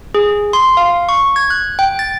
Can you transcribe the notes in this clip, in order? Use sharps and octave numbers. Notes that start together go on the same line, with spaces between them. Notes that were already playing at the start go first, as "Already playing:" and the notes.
G#4
C6
F5
C#6
G#6
F#6
G5
A6